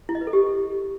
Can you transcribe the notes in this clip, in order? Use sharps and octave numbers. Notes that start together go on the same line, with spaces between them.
E4
D#5
B4
A4
G4